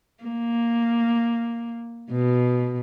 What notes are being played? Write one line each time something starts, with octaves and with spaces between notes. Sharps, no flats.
A#3
B2